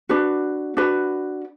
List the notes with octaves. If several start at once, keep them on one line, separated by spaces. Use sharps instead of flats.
D4 F#4 B4
D4 F#4 B4